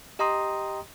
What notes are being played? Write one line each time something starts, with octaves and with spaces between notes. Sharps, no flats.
G4 D#5 G5 A#5 C6 D#6